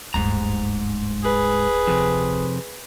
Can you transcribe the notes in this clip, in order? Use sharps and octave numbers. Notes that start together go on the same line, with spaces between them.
D1 G1 G#2 A#5
G#4 B4
F2 C3